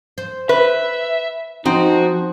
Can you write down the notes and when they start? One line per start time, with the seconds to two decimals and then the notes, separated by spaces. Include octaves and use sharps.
0.18 C5
0.49 B4 E5
1.66 F3 C4 D#4 F#4